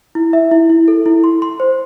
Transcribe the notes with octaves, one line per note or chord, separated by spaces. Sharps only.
E4
E5
E4
E4
A4
E4
C6
C6
C5